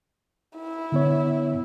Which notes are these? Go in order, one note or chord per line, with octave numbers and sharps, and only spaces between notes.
E4
D3 B3 C#5